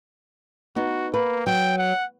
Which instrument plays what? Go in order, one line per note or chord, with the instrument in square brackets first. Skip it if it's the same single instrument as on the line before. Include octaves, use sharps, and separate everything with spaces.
[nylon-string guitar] B3 D#4 [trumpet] F#4
[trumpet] A#3 [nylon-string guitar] B4
[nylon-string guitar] F#3 [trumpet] G5
[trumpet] F#5